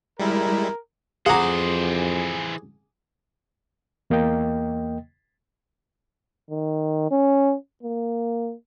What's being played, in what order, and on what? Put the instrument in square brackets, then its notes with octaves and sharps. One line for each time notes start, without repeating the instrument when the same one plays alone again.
[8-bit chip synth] G3 G#3 E4 [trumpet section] A#4
[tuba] F2 [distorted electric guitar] E3 C5 [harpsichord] G#4 D6 [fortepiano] F#5 G#5 A#5
[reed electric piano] E2 A#3 D#5 G5
[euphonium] D#3
C#4
A#3